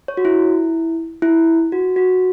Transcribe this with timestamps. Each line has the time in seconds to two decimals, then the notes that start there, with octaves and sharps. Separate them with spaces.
0.08 C#5
0.17 F#4
0.25 E4
1.22 E4
1.72 F#4
1.96 F#4